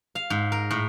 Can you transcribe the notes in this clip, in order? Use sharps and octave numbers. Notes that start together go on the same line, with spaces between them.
F5
G#2
A#4
A2